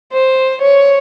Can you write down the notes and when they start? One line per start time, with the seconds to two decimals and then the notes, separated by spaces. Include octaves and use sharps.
0.13 C5
0.62 C#5